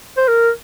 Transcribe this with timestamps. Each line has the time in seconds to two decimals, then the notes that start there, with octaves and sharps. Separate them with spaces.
0.17 C5
0.28 A#4